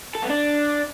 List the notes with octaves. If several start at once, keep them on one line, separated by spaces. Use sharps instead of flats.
A4
B3
D4